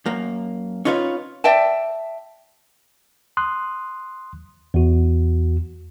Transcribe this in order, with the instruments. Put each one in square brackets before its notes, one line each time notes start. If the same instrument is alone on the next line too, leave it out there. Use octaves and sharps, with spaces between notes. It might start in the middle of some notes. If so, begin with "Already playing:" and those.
[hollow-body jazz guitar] F#2 A#3
C#4 D#4 F4 B4 C#5
[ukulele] D5 E5 G5 A5
[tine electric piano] C6 D#6 F#6
E2 F#4